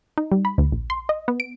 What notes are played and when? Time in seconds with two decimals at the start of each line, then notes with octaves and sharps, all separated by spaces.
0.18 D#4
0.32 G3
0.45 B5
0.58 D2
0.72 A#1
0.90 C6
1.09 D#5
1.28 B3
1.40 D7